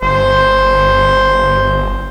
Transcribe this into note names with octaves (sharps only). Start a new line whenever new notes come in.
G1 C5